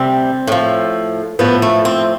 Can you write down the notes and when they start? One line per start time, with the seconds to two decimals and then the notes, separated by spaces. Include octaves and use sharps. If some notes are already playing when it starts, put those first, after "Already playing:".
Already playing: D2 C3 G3 C4
0.47 A2 F3
1.39 A2 F3 B3
1.62 A3
1.85 C4